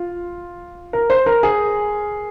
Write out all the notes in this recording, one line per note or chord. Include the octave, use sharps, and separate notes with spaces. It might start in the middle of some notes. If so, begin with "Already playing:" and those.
Already playing: F4
A#4
C5
A#4
G#4